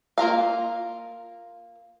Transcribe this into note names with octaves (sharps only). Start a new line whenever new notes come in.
A#3 F4 A#4 F5